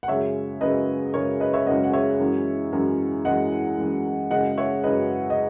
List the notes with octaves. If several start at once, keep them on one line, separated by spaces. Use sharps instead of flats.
F#5
F#2 C#3 G#3 C#5 E5
F#2 C#3 G#3 B4 D#5
F#2 C#3 G#3 A#4 C#5
B4 D#5
C#5 E5
F#2 C#3 G#3 D#5 F#5
F#5
C#5 E5
F#2 E3 G#3
F#2 E3 G#3
F#2 E3 G#3 D#5 F#5
F#2 E3 G#3
F#2 C#3 G#3 D#5 F#5
C#5 E5
F#2 C#3 G#3 B4 D#5
D#5